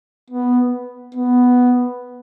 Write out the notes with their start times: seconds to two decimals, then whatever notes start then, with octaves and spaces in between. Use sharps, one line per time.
0.30 B3
1.15 B3